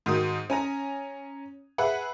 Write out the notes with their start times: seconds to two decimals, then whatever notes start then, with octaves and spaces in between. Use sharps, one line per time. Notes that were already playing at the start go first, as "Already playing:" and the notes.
0.06 G#2 D#3 F#3 D#6
0.50 C#4 G#5 A#5
1.78 G#4 B4 E5 F#5